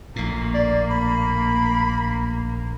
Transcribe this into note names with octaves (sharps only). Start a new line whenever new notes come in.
A#1 A2 A#3
D5
B5